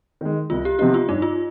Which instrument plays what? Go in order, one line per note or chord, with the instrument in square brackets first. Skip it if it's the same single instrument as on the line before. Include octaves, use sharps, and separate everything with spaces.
[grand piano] D#3 G#3
[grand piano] C2 [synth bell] F4
[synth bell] G4
[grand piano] C3 F3 B3 D#4 [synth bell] G4
[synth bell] F4
[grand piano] G2 [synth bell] D#4
[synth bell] F4